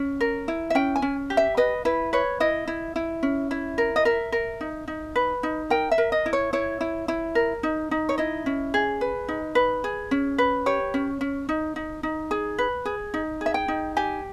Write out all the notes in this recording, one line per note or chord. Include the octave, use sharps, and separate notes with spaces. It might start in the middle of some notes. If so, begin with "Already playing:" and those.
Already playing: C#4
A#4
E4
E5
C#4 G5
G#5
C#4
G4
E5
B4 D#5
E4 B4
B4 C#5
E4 D#5
E4
E4
C#4
E4
A#4
D#5
A#4 E5
A#4
D#4
D#4
B4
D#4
A#4 G5
E5
A#4
D#5
E4
C#5
E4 C#5
E4
E4
A#4
D#4
D#4
C#5
E4 D#5
C#4
G#4
B4
D#4
B4
G#4
C#4
B4
G4 C#5
C#4
C#4
D#4
D#4
D#4
G#4
B4
G#4
D#4
G#4 E5
G5
D#4
G4 G#5